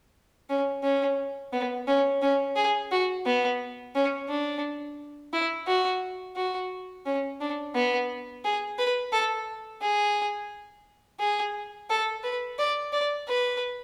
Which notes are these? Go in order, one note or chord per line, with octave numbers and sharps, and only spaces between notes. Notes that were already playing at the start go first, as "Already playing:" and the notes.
C#4
C#4
B3
C#4
C#4
G#4
F#4
B3
C#4
D4
E4
F#4
F#4
C#4
D4
B3
G#4
B4
A4
G#4
G#4
A4
B4
D5
D5
B4